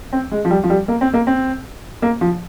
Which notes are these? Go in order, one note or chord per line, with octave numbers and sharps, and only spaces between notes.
C4
G#3
F3
G3
F3
G3
A#3
C4
A#3
C4
A#3
F3